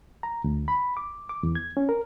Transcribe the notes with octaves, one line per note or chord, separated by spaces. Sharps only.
A#5
D2
B5
D6
D6
E2
G#6
C#4
A#4